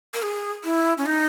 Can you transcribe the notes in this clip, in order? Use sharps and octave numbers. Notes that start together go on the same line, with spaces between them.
A#4
G#4
E4
C#4
D#4